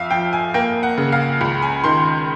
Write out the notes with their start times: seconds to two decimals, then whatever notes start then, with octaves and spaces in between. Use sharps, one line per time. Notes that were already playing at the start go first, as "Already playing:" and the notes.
Already playing: F2 E5 F5
0.11 F3 G5
0.33 G#5
0.54 A#3 G5
0.83 F#5
0.98 C#3
1.12 F5
1.41 C#2
1.62 G#5
1.84 D#3 C6